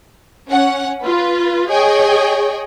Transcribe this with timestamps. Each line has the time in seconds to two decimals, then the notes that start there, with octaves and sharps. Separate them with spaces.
0.49 C#4 F#5
1.02 F4 B4
1.69 G#4 C#5 D#5 G5 G#5 C#6